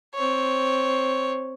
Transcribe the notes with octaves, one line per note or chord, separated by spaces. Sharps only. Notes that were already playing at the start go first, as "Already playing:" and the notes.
C4 C#5